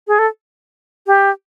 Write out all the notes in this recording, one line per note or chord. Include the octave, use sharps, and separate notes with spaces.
G#4
A4
G4